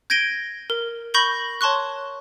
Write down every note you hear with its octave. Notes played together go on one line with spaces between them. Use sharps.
G6 G#6 A#6 D7 D#7 G7
A#4
B5 C#6 G6 A#6 F#7 G7
C#5 A5 C6 C#6 F#6